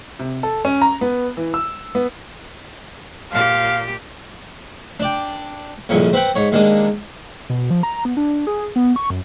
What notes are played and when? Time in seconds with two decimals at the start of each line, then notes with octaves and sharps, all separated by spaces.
0.19 C3
0.43 A4
0.65 C#4
0.82 A#5
1.01 B3
1.37 E3
1.54 E6
1.95 B3
3.32 A#2 G4 F5
5.00 D4 D5 G5
5.89 C2 F2 A#2 C#3
6.13 C4 B4 F#5 G5
6.35 G#2 C#5
6.52 D#2 G#3 A#3 D4 D#6
7.50 B2
7.70 F3
7.83 A#5
8.05 B3
8.17 D4
8.47 G#4
8.76 B3
8.96 C#6
9.10 F#2